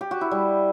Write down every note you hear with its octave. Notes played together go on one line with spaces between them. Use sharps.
G4
F#4
E4
G3